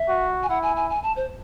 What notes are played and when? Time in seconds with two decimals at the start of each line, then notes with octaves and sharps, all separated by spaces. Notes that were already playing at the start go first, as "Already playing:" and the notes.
Already playing: E5
0.09 F#4
0.43 G#5
0.49 E4 F#5
0.63 G#5
0.77 G#5
0.90 G#5
1.03 A5
1.16 C5